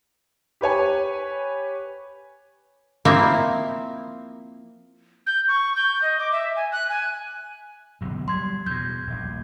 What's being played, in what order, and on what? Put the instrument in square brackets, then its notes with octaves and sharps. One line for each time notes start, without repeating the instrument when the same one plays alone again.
[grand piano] G4 B4 C#5 G#5
[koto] F3 A#3 C4 E4 E5
[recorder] G6
C#6
G6
D#5
D6
E5
G#5
F#6
G#5
[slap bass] D1 B1 E2
[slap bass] F#3 G3 [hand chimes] C6 G#6
[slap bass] E2 B2 [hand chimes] G6 G#6
[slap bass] D#1 A#1